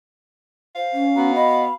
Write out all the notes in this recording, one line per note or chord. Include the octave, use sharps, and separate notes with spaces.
C5 F5
C#4
B3 F#4 A#5
D#5 B5